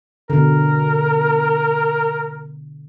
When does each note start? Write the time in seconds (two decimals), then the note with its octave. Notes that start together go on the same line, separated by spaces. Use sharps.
0.30 B2 D3 A#4